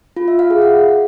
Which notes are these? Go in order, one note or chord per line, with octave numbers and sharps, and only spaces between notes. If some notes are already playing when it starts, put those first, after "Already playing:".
F4
E5
F5
G#4
F#5